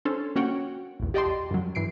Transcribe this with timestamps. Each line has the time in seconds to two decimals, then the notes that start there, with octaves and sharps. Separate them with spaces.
0.05 C#4 D4 A4 C5 C#5
0.36 A#3 C#4 F#4 C#5 F#5 G5
1.00 A#1 E2
1.14 G4 D5 D#5 G5 A5 C6
1.51 F#2 F#3
1.75 G2 E3 C7 D7